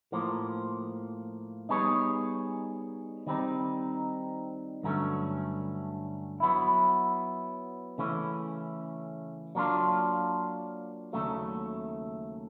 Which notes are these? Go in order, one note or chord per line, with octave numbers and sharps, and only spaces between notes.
A2 F3 A#3
G3 B3 D#4 G#4 C#5
D#3 G3 C4 D#4
G2 D3 F#3 A3 C#4
F#3 B3 E4
C#3 E3 A3 C#4
F#3 A#3 D4 F4
D#2 C#3 F#3 A3